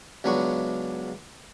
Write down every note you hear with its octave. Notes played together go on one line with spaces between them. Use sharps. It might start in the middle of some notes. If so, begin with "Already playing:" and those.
C#2 F#3 B3 D4 B5 C#6